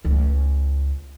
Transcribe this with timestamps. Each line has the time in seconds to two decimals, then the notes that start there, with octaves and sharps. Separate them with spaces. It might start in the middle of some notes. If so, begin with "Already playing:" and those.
0.05 C#2 A3